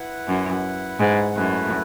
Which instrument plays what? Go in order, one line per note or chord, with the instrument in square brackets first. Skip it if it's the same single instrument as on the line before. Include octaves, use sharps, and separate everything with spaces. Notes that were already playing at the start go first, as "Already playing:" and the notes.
Already playing: [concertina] E4 B4 F#5
[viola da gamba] F#2
G#2
[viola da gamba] F#2 [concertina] A3 E4 B4